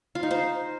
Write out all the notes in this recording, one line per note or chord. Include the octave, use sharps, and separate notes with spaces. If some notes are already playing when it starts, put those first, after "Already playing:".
F4
D#4
C5